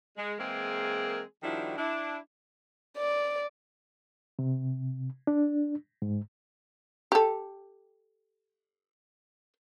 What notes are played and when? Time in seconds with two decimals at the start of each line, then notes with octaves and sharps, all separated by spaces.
0.17 G#3
0.39 E3 G#3 A#3 C4 G#4 A#4
1.43 D#3 F3 G3 D4 E4 F#4
1.78 D4 E4
2.98 D5
4.39 C3
5.27 D4
6.02 G#2
7.12 G4 A4